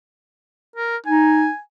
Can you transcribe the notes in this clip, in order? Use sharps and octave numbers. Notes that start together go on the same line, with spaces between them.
A#4
D#4 G#5